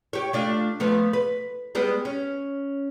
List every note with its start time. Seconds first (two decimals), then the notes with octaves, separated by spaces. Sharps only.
0.13 G4 C#5
0.33 A3 D4 F4
0.80 F3 A3 B3
1.13 B4
1.75 G3 G#3 B3
2.05 C#4